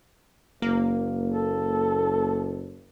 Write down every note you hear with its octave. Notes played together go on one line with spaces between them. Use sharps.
F#1 A#3
A4